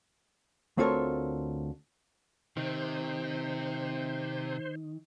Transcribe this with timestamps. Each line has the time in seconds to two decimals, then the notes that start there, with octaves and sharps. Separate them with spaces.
0.78 D2 C4 F4 A4 A#4 C#5
2.57 C3 D#3 C5